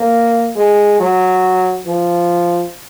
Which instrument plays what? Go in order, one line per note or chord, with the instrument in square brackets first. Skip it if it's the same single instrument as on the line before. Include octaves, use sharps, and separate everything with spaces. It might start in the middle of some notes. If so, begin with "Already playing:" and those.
Already playing: [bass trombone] A#3
G#3
F#3
F3